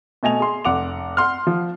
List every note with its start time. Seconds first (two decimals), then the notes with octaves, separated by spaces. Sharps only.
0.23 B2 A3 D#5 G#5 F7
0.40 G#4 C6
0.65 F1 F#5 D6 F7
1.17 F#5 C6 F6
1.47 F3